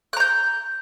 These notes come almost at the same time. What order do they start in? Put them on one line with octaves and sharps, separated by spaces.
F#6 A#5 G6